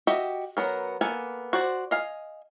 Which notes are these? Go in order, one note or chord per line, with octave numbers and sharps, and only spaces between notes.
F#4 G4 D#5 E5 G5
F#3 B3 A#4
A#3 B3 A4 G#5
F#4 C5 D5
D#5 F5 G#5